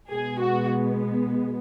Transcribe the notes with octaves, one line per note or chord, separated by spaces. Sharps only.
B2 G#3 B3 G#4
F#4